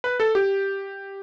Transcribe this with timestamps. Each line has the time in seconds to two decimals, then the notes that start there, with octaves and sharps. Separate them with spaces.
0.04 B4
0.20 A4
0.35 G4